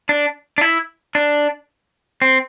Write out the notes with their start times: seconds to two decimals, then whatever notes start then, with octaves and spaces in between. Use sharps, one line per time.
0.09 D4
0.58 D4
0.61 E4
1.15 D4
2.22 C4